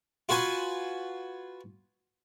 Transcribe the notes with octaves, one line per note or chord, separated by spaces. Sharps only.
F4 F#4 B4 G#5 C6